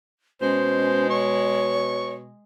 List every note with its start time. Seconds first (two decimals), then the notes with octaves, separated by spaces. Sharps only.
0.41 B2 G#3 C#4 C5
1.10 C#5 C#6